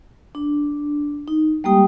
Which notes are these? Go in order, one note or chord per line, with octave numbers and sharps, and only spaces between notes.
D4
D#4
G3 G#3 A#3 G4 G5 D#6